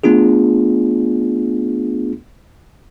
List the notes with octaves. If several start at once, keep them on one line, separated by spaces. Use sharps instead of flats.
A3 B3 D4 F4 G#4